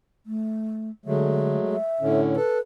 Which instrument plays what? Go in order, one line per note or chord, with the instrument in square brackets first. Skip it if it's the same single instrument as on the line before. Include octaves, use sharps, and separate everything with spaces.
[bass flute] A3
[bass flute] D3 [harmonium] F#3 G#3 A3
[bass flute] E5
[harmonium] A2 D3 C#4
[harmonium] A4 [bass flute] B4